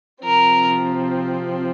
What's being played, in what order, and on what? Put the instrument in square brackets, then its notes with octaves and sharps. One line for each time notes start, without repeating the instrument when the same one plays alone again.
[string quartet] C3 F3 C4 [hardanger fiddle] A#4